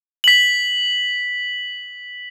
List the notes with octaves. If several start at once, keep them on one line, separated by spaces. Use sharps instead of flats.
B6 F#7